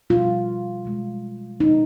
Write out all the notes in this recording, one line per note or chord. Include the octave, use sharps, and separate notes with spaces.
B2 G3 F4
B2 G#3
B2 G#3 D#4